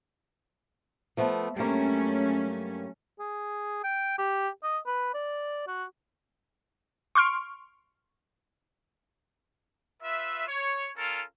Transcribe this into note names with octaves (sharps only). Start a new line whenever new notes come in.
F3 A3 B3
G2 F#3 A3 A#3 C#4
G#4
G5
G4
D#5
B4
D5
F#4
C6 C#6 F6 D7
F4 B4 E5
C#5
C#4 F4 A4 A#4